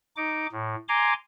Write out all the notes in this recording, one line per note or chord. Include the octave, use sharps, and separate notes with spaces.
D#4 D6
A2
G#5 A#5 C6 D6